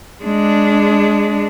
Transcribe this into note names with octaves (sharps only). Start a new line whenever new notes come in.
G#3 D4